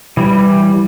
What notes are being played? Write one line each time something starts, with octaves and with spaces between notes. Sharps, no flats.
E3 G3